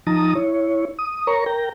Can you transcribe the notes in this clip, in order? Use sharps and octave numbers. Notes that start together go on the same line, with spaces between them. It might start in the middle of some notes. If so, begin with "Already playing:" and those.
F3 D#4 A5 A#5 D#6
E4 C#5
D#6
A#4 C#5 A#5 C#6
A#4 G5 A#5